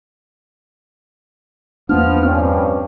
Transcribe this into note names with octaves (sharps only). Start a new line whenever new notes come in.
E2 F3 A#3 B3 D4 F6
G2 F3 C4 C#4